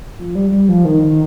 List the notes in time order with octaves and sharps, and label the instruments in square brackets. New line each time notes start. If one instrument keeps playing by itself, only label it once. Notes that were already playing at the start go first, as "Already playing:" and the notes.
[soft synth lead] F3
G3
G3
F3
D#3
D#3